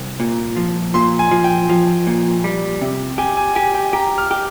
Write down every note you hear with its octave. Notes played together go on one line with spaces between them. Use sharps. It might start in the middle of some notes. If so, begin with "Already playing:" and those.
Already playing: C2
A#2
F3
A#2 C6
G#5
F3
G5
F3
A#2
G3
C3
G4 G#5
G#5
G4 G#5
G5
G4 A#5
F6
G4